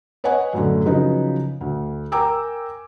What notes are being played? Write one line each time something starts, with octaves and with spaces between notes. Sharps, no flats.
B4 C#5 D#5 F#5 G#5
F#2 A2 D3
C#3 F3 F#3 D#4 B4
D2
A#4 G5 G#5 A#5 D6 E6